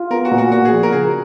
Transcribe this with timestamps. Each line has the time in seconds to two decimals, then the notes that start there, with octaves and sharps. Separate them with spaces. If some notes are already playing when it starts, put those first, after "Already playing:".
Already playing: F4
0.10 B3 A#4
0.25 F#4
0.31 A#2
0.38 F#4
0.51 A#2 F#4
0.65 G#4
0.71 F3
0.83 A#4
0.92 C#3 G#4